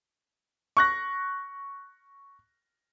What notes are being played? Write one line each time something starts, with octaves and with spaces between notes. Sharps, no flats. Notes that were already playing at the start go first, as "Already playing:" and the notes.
C#6 F#6 A#6